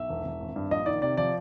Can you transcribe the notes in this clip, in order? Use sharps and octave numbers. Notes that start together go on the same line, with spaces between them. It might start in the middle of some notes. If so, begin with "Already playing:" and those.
Already playing: B1 E5
E1
E1
G#1
G2
A#1 D#5
D#3 D5
C3 D5
F3 D5